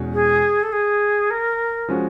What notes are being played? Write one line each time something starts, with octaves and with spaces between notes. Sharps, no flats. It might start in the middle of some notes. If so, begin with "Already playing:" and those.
Already playing: E2 B2 G#3 C#4 F#4
G#4
A4
G#4
A#4
F3 G#3 C#4 F#4